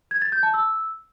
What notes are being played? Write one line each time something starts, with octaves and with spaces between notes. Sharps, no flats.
G#6
A6
G6
A5
E6